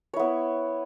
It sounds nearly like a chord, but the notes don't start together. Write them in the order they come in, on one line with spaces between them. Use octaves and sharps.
C#5 E4 B3